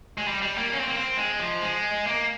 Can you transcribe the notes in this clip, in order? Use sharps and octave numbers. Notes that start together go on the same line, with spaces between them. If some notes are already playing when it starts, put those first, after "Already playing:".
G#3
G3
G3
A#3
C#4
C4
A#3
C4
G#3
F3
G#3
A#3